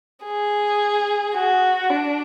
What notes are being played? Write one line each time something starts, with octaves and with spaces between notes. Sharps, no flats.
G#4
F#4
D4